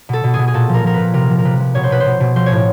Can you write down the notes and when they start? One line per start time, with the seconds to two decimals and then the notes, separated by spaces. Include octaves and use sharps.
0.09 B2 A4
0.24 B2
0.34 G#4
0.39 B2
0.48 G#4
0.54 A#2 A4
0.69 F3 A#4
0.84 F3 A#4
0.94 B4
0.99 A#2
1.14 C3 A#4
1.30 F3
1.39 A#4
1.44 C3 B4
1.60 F3
1.75 B2 C#5
1.84 C5
1.90 B2 B4
2.00 C5
2.06 B2
2.20 B2
2.35 F3 C5
2.46 A2 C#5